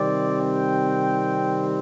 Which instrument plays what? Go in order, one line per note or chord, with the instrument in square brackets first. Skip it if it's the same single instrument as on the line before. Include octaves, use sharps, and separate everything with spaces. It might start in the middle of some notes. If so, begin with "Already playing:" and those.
Already playing: [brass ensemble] C3 D#3 G3 C4 D5
G5